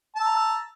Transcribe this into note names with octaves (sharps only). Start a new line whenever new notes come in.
A5 A#5 E6